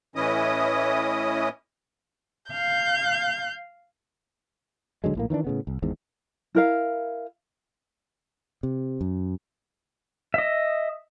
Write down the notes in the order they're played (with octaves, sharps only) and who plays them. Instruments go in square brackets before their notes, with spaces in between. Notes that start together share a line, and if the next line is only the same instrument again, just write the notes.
[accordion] A2 E3 C#4 E4 D#5 D#6
[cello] F5 [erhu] G6
[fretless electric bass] D#1 D3 F#3 G#3
A#1 A2 A#3
D#3 E3 C#4 D4
A2 C#3 B3
C2
G#1 E2 G#2
[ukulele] E4 A#4 F5
[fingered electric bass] C3
F#2
[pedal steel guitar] D#5 E5